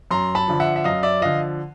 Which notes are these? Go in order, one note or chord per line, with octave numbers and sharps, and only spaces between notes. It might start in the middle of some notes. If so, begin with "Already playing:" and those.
F#2 A#5 C6
A5 B5
D3 F3
E5 F#5
E5
F#2 D#5 F5
D5 E5
D3 F3 D#5 F5